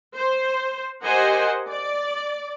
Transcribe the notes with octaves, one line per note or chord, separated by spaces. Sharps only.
C5
G4 A#4 C5 D#5 F#5 G#5
D5